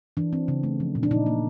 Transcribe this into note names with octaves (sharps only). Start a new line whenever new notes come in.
E3 D4
C4
C#3
A3
F3
A#2
D4
A#2 D#4
A#3